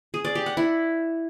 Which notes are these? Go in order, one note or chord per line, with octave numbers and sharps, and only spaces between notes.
G#4
D5
G4
F#5
E4